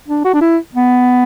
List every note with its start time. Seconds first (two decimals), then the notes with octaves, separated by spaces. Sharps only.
0.09 D4
0.25 F#4
0.34 D4
0.42 E4
0.75 B3